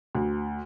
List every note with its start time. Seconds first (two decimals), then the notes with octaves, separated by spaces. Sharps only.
0.15 D2